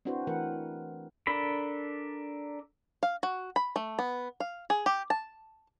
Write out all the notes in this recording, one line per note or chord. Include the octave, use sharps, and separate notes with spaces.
C4 D4 E4 F#4 B4 C5
E3 A3 A#4 B4 F#5
D4 A4 A#4 B5
F5
F#4
B5
A3
B3
F5
G#4
G4
A5